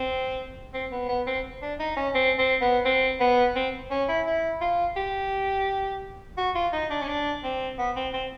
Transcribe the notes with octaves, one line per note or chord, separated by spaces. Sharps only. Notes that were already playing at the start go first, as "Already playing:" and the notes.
Already playing: C4
C4
B3
B3
C4
D4
D#4
C#4
C4
C4
B3
C4
B3
C4
C#4
E4
E4
F4
G4
F#4
F4
D#4
D4
C#4
D4
C4
B3
C4
C4